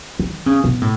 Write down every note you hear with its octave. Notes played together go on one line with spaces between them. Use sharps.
D#3
C#3
B2
A2